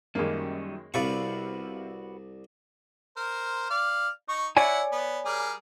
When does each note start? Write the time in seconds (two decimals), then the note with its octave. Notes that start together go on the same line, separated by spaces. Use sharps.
0.15 F#2 D#3 G3 G#3 A#3 C#4
0.94 C2 C3 F#4 B4 D5 F5 C#6 A6
3.17 A#4 C5
3.70 D5 F5
4.29 D#4 C#6
4.57 E4 C#5 D5 F#5 G#5
4.92 B3
5.26 G3 G#4 A#4